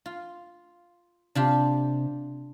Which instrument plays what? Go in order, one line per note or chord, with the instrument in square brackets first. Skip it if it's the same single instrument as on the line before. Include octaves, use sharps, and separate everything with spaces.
[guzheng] F4
[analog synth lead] C3 [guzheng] D4 F4 G4